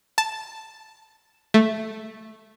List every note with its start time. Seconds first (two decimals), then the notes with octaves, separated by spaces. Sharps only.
0.18 A5
1.54 A3